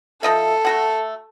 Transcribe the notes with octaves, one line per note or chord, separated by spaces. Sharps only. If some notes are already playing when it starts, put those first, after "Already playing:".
F3 A4 D#5 E5
A3 F#4 F#5